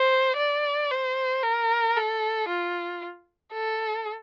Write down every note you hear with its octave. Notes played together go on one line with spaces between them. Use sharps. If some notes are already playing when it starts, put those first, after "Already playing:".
Already playing: C5
D5
C5
A#4
A4
F4
A4